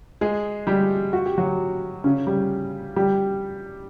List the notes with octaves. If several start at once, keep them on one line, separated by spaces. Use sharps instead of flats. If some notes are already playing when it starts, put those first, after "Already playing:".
G#3 G#4
G3 G4
F#4
G4
F#3 F#4
C#3 C#4
G3 G4
G3 G4